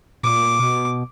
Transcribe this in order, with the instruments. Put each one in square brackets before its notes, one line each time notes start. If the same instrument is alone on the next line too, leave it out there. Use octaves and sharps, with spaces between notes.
[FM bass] A#2 [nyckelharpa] D6
[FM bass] B2